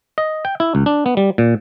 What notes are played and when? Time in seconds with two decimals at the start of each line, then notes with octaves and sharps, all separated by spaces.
0.18 D#5
0.45 G5
0.60 E4
0.75 C#2
0.86 D4
1.06 B3
1.17 G3
1.38 A#2